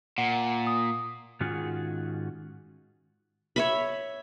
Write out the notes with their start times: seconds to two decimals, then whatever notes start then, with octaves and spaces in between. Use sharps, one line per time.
0.18 A#2 F#5
0.67 D#6
1.40 G#2 D#3 C#4 F4 F#4 G#4
3.56 C#5 E5 B5